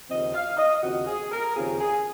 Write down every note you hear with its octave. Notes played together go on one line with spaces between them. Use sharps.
D#2 C#3 F3 C4 D#5
F5
D#5
D#2 C#3 F3 C4 F#4
G#4
A#4
D#2 C#3 F3 C4 G#4
G#4